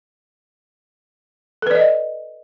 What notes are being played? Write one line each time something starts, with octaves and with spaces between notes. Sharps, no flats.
A4 B4 D5 D#5